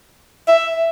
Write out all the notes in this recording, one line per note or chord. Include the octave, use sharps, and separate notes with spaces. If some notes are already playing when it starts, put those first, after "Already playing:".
E5